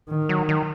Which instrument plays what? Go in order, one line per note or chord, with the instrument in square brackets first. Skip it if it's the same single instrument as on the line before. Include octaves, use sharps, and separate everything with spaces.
[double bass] D#3
[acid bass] F#3
D#3